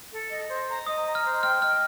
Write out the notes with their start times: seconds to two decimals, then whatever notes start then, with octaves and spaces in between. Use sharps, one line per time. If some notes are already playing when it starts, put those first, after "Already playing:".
0.11 A4
0.30 D#5
0.49 C5
0.68 A#5
0.86 D#5 D#6
1.05 A#5
1.15 F6
1.24 C5
1.43 G5 F6
1.62 D#5 F6